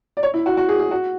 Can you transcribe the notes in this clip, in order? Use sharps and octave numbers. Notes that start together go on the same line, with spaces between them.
D5
C#5
E4
F#4
F#4
G#4
G#4
F#4